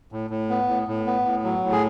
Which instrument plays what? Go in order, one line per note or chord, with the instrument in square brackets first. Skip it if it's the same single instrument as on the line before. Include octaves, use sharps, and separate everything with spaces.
[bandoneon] A2
A2
B3
A2
A2
B3
A2
F#3
A2
G#4